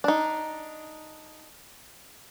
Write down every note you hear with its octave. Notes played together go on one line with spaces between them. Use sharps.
D4 D#4